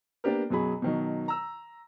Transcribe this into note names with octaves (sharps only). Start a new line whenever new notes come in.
A#3 B3 D4 G4 A#4
F#2 B2 F#3 G#4 B5
B2 D#3 F#3
A#5 E6